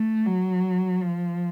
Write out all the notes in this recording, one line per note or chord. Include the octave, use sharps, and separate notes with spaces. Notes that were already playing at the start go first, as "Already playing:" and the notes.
Already playing: A3
F#3
F3